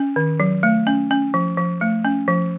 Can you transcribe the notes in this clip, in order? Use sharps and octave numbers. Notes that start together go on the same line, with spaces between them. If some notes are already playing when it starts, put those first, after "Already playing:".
Already playing: C#4
D#3
F#3
A3
C#4
C#4
F3
F3
A3
C#4
F3